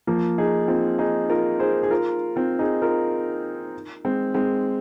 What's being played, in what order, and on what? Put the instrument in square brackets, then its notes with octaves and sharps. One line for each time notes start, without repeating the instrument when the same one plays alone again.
[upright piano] F3 A#3
D#4 G#4
C4 F4
D#4 G#4
F4 A#4
G#4 C5
G#4
F4 A#4
C4 F4
D#4 G#4
F4 A#4
G#3 C4
G#3 C4